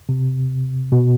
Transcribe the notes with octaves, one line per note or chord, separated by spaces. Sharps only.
C3
B2